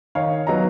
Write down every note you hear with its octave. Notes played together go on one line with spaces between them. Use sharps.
D#3 C#5 F5
F#3 B3 D#4 A#5